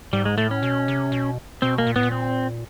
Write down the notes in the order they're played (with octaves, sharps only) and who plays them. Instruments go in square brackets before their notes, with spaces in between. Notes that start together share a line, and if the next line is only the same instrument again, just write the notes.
[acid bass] G#2 [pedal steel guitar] G3
[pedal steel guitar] G#3
[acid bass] A2 [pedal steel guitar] A3
[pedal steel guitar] C#4
[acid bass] B2
C3
B2
[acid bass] B2 [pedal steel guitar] C4
[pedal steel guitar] A#3
[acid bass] A#2
[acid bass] A2 [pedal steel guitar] B3
[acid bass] A#2
[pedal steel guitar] C4